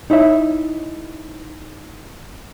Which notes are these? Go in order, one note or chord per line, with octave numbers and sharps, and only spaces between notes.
D#4 E4 C#5 E5